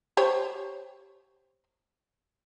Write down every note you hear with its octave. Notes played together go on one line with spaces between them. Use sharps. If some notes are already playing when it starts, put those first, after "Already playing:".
G4 C5 C#5